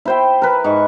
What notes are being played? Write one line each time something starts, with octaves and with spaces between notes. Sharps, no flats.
E4 C5 G5
A#4 B4
G#2 C#6